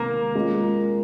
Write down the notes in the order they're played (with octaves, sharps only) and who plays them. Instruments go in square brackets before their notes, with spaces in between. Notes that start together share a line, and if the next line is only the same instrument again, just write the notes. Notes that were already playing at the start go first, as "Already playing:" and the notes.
Already playing: [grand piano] C3 D#3 G#3 C4 [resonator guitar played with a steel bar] A#3
[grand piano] G#3 C#4 F4 G#4